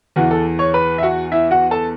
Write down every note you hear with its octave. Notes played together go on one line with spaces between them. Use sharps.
E2 E3 F#4
A4
C#5 C#6
B4 B5
E5
F#4 F#5
E4 E5
F#4 F#5
A4 A5